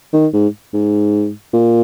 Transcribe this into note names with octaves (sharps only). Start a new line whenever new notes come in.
D#3
G#2
G#2
A#2